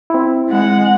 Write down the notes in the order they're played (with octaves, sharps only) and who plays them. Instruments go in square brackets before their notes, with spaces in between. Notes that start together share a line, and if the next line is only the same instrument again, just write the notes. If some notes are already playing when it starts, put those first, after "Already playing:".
[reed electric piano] C4 E4
[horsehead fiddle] G#3 F#5